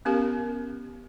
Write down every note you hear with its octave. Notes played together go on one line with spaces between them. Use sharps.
B3 C#4 G4 A#4